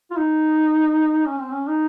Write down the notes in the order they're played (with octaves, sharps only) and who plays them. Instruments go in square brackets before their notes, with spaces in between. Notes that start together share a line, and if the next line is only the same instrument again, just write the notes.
[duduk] F4
D#4
C#4
C4
C#4
D#4